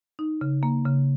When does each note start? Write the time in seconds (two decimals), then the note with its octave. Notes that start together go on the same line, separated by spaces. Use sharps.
0.19 D#4
0.41 C#3
0.63 A#3
0.85 C#3